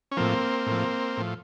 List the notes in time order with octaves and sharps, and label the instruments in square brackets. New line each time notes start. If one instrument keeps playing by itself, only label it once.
[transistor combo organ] C#4
A2 F3 A#3 C4
A2
F3
A2 F3